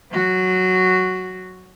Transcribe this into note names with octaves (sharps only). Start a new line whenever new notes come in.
F#3 F#4